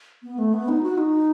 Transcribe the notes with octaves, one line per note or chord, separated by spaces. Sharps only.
B3
A3
B3
D#4
F#4
D#4